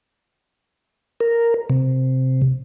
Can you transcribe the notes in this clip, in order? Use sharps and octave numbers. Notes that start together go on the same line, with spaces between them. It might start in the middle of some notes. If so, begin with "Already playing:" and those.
A#4
C3